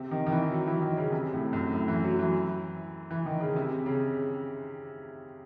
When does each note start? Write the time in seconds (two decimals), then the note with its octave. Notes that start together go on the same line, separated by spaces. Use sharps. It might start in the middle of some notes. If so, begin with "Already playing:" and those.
Already playing: C3
0.11 D#3
0.27 D#3
0.32 E3
0.51 F#3
0.68 E3
0.82 D#3
0.97 C#3
1.12 C3
1.33 A2
1.53 F#2
1.73 A2
1.88 E3
2.04 F#3
2.19 E3
3.11 E3
3.26 D#3
3.40 C#3
3.56 C3
3.86 C#3